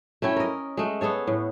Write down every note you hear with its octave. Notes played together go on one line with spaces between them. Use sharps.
A3 C#4 E4 G5
A#4 D#5
G#3 A3
B3 G#4 A4 C#5
A2